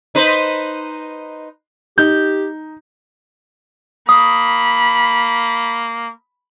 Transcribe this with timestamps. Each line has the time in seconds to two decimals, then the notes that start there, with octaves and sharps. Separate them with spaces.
0.15 D#4 B4 C5
1.98 D#4 G4 G6
4.09 A#3 B5 D#6